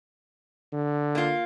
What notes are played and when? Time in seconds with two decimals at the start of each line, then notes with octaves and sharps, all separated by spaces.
0.73 D3
1.15 A#3 F4